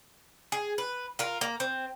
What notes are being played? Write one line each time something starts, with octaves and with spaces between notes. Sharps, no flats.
G#4
B4
F4 A#4
A#3
C4